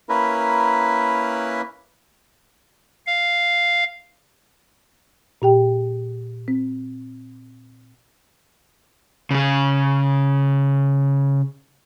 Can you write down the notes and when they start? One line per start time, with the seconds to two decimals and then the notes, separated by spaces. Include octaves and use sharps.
0.09 A#3 C#4 E4 A#4 B4
3.07 F5
5.42 A#2 G4 G5
6.48 C4
9.31 C#3 G#4